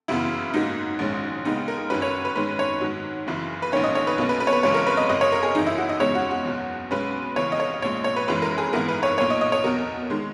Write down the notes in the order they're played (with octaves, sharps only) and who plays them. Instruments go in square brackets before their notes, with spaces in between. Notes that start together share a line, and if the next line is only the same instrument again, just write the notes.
[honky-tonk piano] F#2 C#3 E3 B3 E4
G#2 F#3 A#3 D#4
A#1 G#2 D#3 G#3 C#4
D#2 C#3 G#3 B3 D#4
A#4
F#2 D#3 F#3 C#4 B4
C#5
B4
G#2 D#3 G#3 C#4 B4
C#5
G#2 D#3 F#3
F#1 F#2 C#3 E3
B4
A#1 G#2 D#3 A#3 C#4 C#5
D#5
C#5
B4
B1 B2 A#3 C#4
B4
B4
C#5
B4
F#1 F#2 C#3 E3 G#3 C#5
A#4
B4
D#5
G#1 F#2 C#3 D#5
C#5
A#4
G#4
G#1 F#2 E3 D#4
E4
F#4
D#5
E2 C#3 G#3 C#4 C#5
F#4
F#4
F#1 E2 B2
B1 B2 G#3 C#4 B4
D#2 C#3 E3 C#5
D#5
C#5
A#1 A#2 G#3 C#5
C#5
B4
G#1 F#2 E3 G#3 C#4 B4
A#4
G#4
G#1 G#2 E3 B3 A#4
B4
C#5
B1 A#2 A#3 C#5
D#5
D#5
C#5
E2 B2 F#3 A#4
D#3 G#3